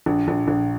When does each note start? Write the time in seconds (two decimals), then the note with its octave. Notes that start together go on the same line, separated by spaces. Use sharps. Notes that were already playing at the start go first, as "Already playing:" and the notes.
0.06 A#1
0.28 A#1
0.48 A#1